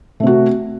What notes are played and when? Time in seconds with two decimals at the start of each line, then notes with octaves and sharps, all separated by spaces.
0.20 A3
0.23 C3
0.27 F#4